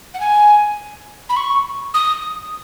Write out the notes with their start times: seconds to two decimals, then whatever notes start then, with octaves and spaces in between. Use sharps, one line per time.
0.14 F#5
0.20 G#5
1.29 B5
1.37 C#6
1.94 D#6